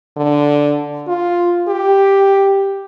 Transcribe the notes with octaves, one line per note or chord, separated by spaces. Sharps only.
D3
F4
G4